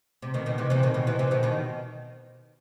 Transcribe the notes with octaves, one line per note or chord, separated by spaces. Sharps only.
C3
B2 D#3
B2 D#3
C3 E3
C3 E3
B2 D#3
B2 D#3
C3 E3
C3 E3
B2 D#3
B2 D#3